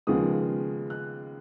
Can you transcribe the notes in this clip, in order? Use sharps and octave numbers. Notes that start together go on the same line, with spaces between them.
D#2 C#3 F3 G#3 B3 D#6
F#6